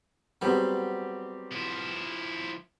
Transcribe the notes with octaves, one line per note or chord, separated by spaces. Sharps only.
F#3 G3 B3 C4 G4 G#4
F3 E4